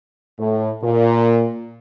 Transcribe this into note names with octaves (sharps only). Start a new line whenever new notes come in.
A2
A#2